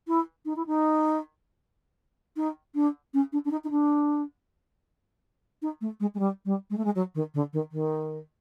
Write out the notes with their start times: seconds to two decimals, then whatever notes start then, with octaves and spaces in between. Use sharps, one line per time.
0.07 E4
0.45 D#4
0.56 E4
0.66 D#4
2.36 D#4
2.74 D4
3.13 C#4
3.32 D4
3.45 D4
3.51 D#4
3.64 D#4
3.70 D4
5.62 D#4
5.81 A3
6.00 G#3
6.14 G#3
6.19 G3
6.45 G3
6.70 G#3
6.77 A3
6.84 G#3
6.95 F#3
7.15 D#3
7.34 D3
7.53 D#3
7.72 D#3